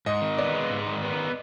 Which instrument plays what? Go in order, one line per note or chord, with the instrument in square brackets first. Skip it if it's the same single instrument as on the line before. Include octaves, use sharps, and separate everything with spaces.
[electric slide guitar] G#2 [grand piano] D#5
[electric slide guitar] D#3
[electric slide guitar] B3 [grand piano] D5
[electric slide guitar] G#3
G#2
D#3
B3